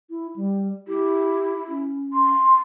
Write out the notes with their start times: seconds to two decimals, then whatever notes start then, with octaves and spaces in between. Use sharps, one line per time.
0.10 E4
0.36 G3
0.88 E4 G4
1.68 C#4
2.13 C6